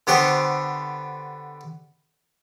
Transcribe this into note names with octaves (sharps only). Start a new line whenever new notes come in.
D3 B3 G4 C5 C#6